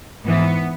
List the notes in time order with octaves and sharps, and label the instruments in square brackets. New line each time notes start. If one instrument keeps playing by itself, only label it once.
[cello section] G#2 E3 B3